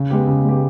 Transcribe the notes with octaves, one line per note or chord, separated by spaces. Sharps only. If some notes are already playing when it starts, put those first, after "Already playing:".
Already playing: C#3
G#3 B3 G4
C#3
G#3 B3 G4